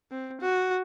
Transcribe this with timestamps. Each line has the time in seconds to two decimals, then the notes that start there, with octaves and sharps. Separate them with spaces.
0.11 C4
0.41 F#4